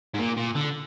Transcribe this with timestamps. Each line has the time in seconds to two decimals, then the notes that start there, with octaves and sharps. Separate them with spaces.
0.14 G#2
0.19 A#2
0.37 A#2
0.55 D3